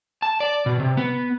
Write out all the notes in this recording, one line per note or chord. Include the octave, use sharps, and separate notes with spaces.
A5
D5
B2
C3
B3